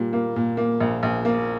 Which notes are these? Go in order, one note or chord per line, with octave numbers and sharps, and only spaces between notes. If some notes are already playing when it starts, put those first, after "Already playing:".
Already playing: A#2 G3
A#3
A#2
A#3
A#1
A#1
A#3